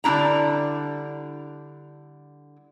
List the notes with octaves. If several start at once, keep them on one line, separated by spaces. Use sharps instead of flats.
D3 G3 D4 E4 A#5